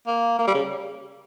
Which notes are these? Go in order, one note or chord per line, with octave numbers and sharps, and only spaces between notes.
A#3
A#3
G3
C#3